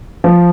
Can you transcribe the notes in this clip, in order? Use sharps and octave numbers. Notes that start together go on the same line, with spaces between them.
F3